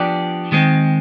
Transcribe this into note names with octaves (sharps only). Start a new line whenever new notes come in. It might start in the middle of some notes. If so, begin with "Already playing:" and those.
Already playing: F3 B3 D4 G4 D5
D#3 G#3 C4